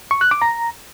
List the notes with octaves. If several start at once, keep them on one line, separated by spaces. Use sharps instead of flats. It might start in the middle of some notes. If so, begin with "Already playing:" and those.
C#6
F#6
D6
A#5